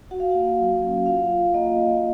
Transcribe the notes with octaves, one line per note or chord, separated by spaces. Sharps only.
F#4 F#5
F5
A#3 F#5
F#3
C#4
F4 F5
F4
A#3 D#5
A#3